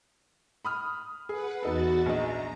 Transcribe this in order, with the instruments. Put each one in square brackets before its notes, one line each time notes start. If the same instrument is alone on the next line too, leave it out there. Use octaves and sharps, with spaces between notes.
[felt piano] B5 D#6 F6
[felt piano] G#4 [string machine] B4 F#5
[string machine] E2 F#4 A6 [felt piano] B3 D#4 A4
[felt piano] A#1 D#5 [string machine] A#5